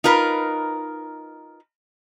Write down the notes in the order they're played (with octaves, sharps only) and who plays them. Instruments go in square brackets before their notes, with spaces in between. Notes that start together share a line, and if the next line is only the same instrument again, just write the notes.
[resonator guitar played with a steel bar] D#4 F4 A#4 B4